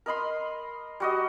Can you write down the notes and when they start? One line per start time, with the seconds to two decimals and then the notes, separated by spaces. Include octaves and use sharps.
0.06 A#4 D#5 B5 C6
1.00 G3 F#4 D#5